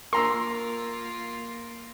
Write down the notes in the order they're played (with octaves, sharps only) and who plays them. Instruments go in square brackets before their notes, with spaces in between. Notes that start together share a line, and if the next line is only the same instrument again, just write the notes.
[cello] A#3 F4 [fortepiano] A#4 A#5 E6 [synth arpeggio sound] C6